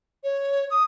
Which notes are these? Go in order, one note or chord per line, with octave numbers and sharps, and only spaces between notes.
C#5
D#6